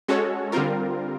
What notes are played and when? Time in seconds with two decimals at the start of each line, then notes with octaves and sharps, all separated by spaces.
0.08 G#3 C#4 F#4 A4 C#5
0.52 D3 G3 C4 F4 A#4